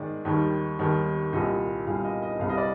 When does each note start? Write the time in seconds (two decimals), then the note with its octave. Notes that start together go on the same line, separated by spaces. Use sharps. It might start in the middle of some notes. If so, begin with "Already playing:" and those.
Already playing: G#2 D#3 G#3 D5
0.25 D#2 D#3 G3
0.79 D#2 D#3 G3
1.33 C2 A#2 G3 D#5
1.86 C2 A#2 G3 F5
2.04 D#5
2.22 D#5
2.40 C2 C3 G3 F5
2.49 D#5
2.58 D5